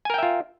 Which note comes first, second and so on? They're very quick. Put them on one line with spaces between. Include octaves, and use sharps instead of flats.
G#5 A#4 G5 E5 F4